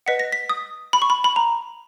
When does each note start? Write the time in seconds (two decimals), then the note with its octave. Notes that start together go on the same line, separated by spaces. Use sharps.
0.06 B4 D#5 F#5 B6
0.19 A#6
0.32 B6
0.49 D#6
0.93 B5
1.02 C#6
1.10 B5
1.24 B5
1.36 A#5